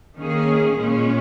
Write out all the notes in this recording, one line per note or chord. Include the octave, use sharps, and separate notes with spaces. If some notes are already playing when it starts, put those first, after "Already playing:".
D#3 A#3 C#4 G#4
A#2 G#3 C#4